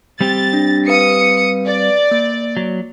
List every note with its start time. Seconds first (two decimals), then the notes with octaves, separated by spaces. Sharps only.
0.21 G3 C4 G4 A6
0.53 D4 A#6
0.88 B4 F5 D#6 C#7
1.67 D5
2.11 A#3
2.57 F#3